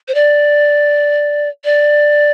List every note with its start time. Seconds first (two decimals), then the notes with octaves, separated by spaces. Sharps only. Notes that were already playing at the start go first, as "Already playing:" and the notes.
0.08 C5
0.15 D5
1.65 D5